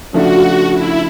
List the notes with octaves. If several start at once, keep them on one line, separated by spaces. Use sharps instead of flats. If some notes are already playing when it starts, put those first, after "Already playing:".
C#3 F3 A3 D4 F#4
E4